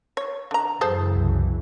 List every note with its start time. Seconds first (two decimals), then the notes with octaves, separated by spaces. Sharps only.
0.17 C#5
0.51 D3 A#5
0.81 F#2 C#3 E3 G#4 A4 C5
1.16 C2